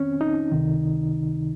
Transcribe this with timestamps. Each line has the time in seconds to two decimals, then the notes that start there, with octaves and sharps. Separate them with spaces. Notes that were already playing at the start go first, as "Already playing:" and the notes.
Already playing: F2 D#3 C4 C#4
0.21 D#4
0.51 C#2 C3 D#3